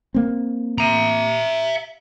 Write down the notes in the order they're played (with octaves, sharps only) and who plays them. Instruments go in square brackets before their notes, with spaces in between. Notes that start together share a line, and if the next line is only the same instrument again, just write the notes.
[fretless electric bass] A#3 C4
[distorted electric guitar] E5 A#5